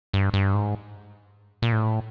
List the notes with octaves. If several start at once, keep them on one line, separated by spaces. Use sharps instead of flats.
G2
G2
G#2
A#2
A2